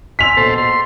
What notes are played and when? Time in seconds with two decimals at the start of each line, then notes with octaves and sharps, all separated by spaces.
0.19 G#5 C6 E6 B6 F7
0.37 A#1 B2 A4 C5
0.58 C6